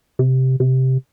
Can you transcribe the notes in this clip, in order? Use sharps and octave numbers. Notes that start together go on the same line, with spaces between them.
C3
C3